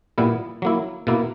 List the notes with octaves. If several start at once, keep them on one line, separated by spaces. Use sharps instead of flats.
A#2 G3 B3 E4
F#3 A#3 E4
B2 A#3 E4